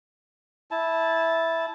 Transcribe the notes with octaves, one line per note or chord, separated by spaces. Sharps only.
E4 A5